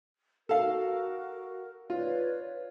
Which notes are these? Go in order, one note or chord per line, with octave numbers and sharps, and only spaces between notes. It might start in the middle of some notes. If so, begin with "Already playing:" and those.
F#4 A4 A#4 F5
F4 B4 C#5 D5